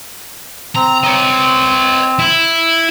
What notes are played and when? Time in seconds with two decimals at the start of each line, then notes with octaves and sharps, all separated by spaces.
0.76 C4 A#5
1.04 C#5 D#5
2.19 E4